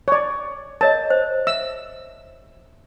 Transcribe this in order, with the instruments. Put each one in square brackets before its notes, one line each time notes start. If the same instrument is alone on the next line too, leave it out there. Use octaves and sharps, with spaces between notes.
[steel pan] C#5 D5
[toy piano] A#4 C#5 D#5 [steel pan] A5
[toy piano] C5
[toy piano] E5 [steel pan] E6